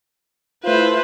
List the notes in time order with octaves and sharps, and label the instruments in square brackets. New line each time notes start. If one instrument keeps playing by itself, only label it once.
[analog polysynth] A3 E4 F4 [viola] B4 C5